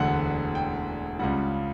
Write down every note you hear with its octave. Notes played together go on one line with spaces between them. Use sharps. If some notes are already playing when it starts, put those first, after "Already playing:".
Already playing: E1 D2 D3 F#5
G5
C#2 C#3 G3 F#5